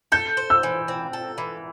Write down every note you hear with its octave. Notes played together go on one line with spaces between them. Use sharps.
A4 G6
C5
E6
E3
C4
A4
E3